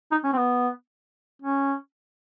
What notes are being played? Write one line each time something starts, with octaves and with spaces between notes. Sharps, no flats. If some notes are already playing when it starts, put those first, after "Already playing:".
D#4
C#4
C4
B3
C#4